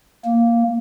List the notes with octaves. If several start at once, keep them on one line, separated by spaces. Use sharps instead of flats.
A#3